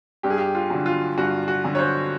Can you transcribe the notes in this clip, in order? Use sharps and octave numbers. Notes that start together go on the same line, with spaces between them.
G2 G4
G#4
G4
F4
D3 F#3
F4
G2 F#4
F#4
D3 F#3
C#5
C5